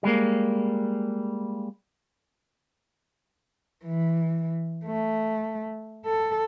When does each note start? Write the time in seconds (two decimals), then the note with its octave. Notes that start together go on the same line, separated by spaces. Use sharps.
0.03 G3 G#3 A#3
3.85 E3
4.86 A3
6.05 A4